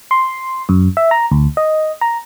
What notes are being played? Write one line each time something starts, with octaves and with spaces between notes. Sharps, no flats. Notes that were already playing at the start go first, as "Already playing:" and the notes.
C6
F#2
E5
A#5
D2
D#5
A#5